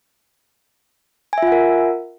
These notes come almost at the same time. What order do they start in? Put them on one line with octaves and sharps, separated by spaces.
G#5 E5 F4 F#5 A#4